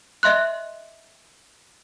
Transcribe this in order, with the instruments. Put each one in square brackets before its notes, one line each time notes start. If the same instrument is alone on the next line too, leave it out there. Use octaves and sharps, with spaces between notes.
[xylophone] D#5 E5 C6 F#6